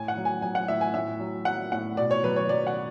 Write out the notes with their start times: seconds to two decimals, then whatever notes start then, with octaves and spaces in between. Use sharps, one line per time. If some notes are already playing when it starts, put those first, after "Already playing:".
Already playing: A2 G#5
0.08 F#5
0.17 F#3
0.25 G#5
0.42 F#3 G#5
0.55 F#5
0.68 A2 E5
0.81 G#5
0.94 A2 E5
1.19 F#3
1.45 F#3 F#5
1.72 A2 F#5
1.97 B2 D5
2.11 C#5
2.23 F#3 B4
2.36 C#5
2.49 F#3 D5
2.67 F#5